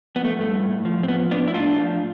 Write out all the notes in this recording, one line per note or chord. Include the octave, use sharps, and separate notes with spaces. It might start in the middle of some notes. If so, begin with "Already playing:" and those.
F3 B3
A3
G2 A3
A2
F3
C4
F3 B3
A2 B3 D4
E4
A2 D4 F4
F3